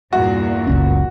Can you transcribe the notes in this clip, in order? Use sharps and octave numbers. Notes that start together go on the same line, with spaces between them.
E2 G2 A#2 F#4
F#1 C#2 C#4